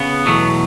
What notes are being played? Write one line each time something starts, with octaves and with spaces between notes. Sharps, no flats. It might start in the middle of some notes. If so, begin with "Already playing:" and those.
Already playing: C#3 B3
E2 B2 F#3 A3